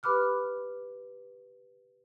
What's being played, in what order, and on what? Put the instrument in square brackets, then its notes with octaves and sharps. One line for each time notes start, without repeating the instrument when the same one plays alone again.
[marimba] G4 B4 B5 D6 F6 F#6